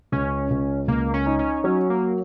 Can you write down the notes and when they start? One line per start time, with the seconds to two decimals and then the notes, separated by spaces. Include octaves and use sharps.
0.12 C#2 C#4
0.50 C#2
0.88 C#2 A#3
1.13 C#4
1.26 D#4
1.39 C#4
1.64 F#3 C#4
1.90 A#3